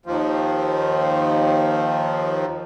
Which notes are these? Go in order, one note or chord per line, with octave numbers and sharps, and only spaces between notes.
D#2 F3